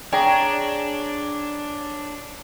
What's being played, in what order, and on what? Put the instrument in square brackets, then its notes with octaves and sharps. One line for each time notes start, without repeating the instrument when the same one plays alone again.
[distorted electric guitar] D4 [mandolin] G#4 [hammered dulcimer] C#5 D5 A#5 [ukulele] G5